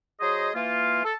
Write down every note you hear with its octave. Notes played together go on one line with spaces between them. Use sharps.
F#3 G#4 C5 D#5
E3 A#3 F4
A4